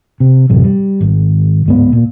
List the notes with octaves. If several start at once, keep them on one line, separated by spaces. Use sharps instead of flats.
C3
A1 F#2 C3
G3
G#1
D1 G#2 B3
A#2